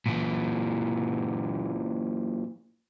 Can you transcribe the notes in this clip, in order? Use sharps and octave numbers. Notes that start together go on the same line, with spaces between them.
A#2 E3